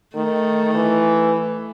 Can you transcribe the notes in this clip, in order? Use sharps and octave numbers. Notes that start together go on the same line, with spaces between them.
D#3 A3
E3